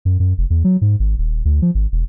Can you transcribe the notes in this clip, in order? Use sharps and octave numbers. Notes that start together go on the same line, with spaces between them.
F#2
F#2
F1
E2
F#3
G#2
G#1
D#1
D2
F3
G#1
E1